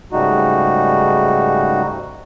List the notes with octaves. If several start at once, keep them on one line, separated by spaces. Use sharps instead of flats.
G#2 C#3 G3 A3 D#4 F#4